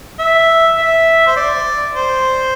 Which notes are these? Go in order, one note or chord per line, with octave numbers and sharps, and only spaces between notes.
E5
E5
C5
D5
C5